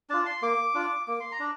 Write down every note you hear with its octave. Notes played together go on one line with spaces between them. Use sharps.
D4 F4 A5
C6
A#3 D6
D4 F4
A#3 D6
C6
A#5
D4